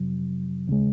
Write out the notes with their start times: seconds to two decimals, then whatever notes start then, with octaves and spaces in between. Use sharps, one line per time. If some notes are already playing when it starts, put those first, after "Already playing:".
Already playing: F2 C3 F#3
0.68 D#2 C#3 G#3